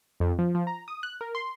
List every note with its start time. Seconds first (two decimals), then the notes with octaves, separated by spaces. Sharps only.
0.20 F2
0.39 F3
0.55 F3
0.67 A#5
0.88 D#6
1.03 F#6
1.21 A#4
1.35 C6